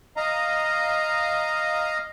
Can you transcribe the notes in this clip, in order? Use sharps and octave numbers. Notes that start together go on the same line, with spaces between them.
D#5 F5 A#5